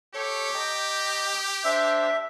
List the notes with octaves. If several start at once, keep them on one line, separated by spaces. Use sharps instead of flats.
G4 A4 C#5 C#6
D#5 G5 A#5
D4 C5 E5 E6